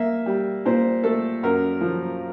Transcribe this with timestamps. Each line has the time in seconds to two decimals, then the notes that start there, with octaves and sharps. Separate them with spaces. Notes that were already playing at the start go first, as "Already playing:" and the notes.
Already playing: A#3 E5
0.26 G3
0.65 A#2 C5
1.04 A3 A4
1.43 F#2 A#4
1.81 F3